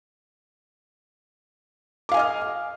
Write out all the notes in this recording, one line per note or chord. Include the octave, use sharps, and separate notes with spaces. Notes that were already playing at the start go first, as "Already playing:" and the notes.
D#5 F5 G#5 D6 F6